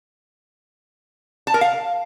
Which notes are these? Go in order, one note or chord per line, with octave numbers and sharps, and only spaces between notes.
A5
A#4
F5